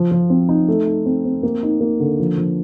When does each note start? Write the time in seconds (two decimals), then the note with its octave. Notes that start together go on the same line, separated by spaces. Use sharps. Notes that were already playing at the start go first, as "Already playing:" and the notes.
Already playing: F3
0.11 F3
0.30 C4
0.49 D#4
0.68 A3
0.87 D#4
1.06 C4
1.25 C4
1.43 A#3
1.63 D#4
1.81 A#3
2.00 D3
2.19 F3
2.37 F3